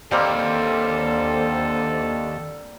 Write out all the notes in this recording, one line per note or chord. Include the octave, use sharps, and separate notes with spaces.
D#2 D3 G3 A#3 C4 A4 C5